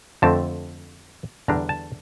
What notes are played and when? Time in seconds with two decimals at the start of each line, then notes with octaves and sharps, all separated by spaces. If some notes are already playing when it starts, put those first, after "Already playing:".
0.22 F2 D3 A3 C4 A5
1.48 E2 D3 G3 D4 A#5
1.69 A5